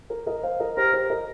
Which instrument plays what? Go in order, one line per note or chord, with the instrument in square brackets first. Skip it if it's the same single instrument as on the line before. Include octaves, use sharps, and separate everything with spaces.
[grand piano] A#4
A#4 D#5
C5 F5
A#4 D#5
[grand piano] G4 C5 [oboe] A#4
[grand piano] G4 C5
A#4 D#5